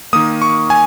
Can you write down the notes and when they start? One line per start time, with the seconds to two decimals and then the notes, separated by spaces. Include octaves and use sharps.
0.13 D#3 A#3 D#6
0.42 C#6
0.70 G#5